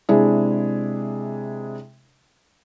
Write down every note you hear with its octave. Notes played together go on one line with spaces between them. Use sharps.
C3 G#3 D4 E4 G#4